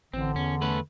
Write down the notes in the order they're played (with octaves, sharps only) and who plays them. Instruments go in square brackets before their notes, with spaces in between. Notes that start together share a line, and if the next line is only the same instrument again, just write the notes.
[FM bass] A1 [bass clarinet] D3 [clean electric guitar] C4
[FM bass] E2 [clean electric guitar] C#4
[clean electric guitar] A3 C#4 B4